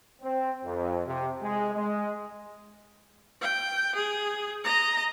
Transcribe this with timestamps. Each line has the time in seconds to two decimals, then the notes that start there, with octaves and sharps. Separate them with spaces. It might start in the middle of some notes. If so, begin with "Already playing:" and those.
0.22 C4
0.64 F2
1.06 C3
1.43 G#3
1.74 G#3
3.41 G5
3.95 G#4
4.64 D#5 A#5